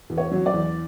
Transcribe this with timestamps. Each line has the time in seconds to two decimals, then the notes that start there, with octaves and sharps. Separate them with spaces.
0.10 E2
0.18 C#5
0.31 F#3
0.46 D5
0.54 E2